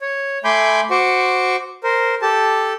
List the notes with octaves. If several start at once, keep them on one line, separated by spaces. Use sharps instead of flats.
C#5
A3 G#5 B5 C6 D6 G6
F#4 C5 C#6 D6
A#4 C5
G4 A4 A5